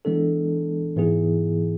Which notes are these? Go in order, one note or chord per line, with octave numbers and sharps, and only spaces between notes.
E3 G#3 B3 D4 A4
G#2 E3 B3 E4 G#4